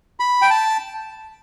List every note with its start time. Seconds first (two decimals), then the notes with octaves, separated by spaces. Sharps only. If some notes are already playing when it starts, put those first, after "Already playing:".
0.20 B5
0.42 G5
0.50 A5